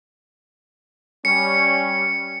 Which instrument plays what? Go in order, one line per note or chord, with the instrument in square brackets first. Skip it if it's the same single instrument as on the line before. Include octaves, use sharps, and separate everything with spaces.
[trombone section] G3 C#4 [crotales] C#7